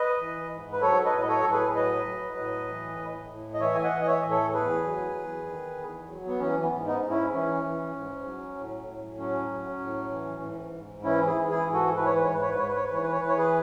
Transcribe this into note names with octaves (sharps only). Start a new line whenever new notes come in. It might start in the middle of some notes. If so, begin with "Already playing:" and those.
Already playing: B4 D#5
E3
G#2
B4
F#3 A4 C#5
B4 D#5
A2
D#5
A4 C#5
A2 A4
G#4 B4
F#3 B4 D#5
F#3
A2
E3
A2
A2
D#5
E3 C#5 E5
G#5
D#5 F#5
E3
D#5
C#5 E5
A2
A4 C#5
E2 G#4 B4
F#3
E2
D#3
E2
F#3
B3
E3 C#4
B3
G#2
B3 D#4
G#2
C#4 E4
E3 C#4
E3
G#2
F#3
A2
A2
F#3 C#4
F#3
A2
E3
G#2
G#2
E3 C#4 E4
E4 G#4
E3
E4 G#4
G#2
F#4 A4
E3 B4
C#5
B4
C#5
G#2 B4
C#5
B4
G#2 C#5
B4
C#5
B4
E3 C#5
B4
C#5
E3 B4
C#5
G#4 B4